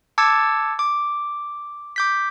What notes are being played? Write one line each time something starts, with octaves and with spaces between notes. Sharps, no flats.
A5 D6 E6 G#6 A6 C#7
D6
D6 G6 B6